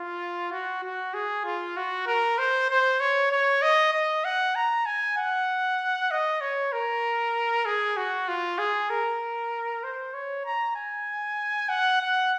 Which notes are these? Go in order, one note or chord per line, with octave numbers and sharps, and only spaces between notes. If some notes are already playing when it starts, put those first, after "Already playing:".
Already playing: F4
F#4
F#4
G#4
F4
F#4
A#4
C5
C5
C#5
C#5
D#5
D#5
F#5
A#5
G#5
F#5
D#5
C#5
A#4
G#4
F#4
F4
G#4
A#4
C5
C#5
A#5
G#5
F#5
F#5